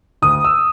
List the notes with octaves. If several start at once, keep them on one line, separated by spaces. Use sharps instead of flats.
D2 D#6
E6